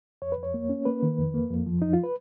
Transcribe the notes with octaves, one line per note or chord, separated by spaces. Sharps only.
F2 C#5
B4
F2
C#5
A#3
C#4
A#3 B4
D#3
F2
A#3
F2
F3
F2 D#4
F4
B4